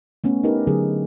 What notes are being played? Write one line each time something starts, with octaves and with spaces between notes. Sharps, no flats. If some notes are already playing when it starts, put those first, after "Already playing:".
A3 B3 C#4
D4 D#4 G4 A#4 B4
D3 F#3 G#4